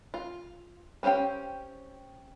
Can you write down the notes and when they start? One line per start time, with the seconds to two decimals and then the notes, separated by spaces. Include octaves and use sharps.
0.14 F4
1.03 C4 C#4 G4 F5 G5